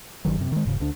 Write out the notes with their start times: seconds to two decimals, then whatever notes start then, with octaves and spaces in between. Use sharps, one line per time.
0.25 G1 D#3 F#3
0.38 F#2 C3
0.52 D#3 G#3
0.65 E1 G#2 C#3
0.80 D2 D3 D4